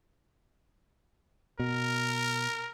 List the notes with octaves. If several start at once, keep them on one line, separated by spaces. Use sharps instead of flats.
B2 A#4